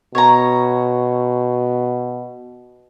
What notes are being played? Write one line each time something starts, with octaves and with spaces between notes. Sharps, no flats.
B2 C#5 A#5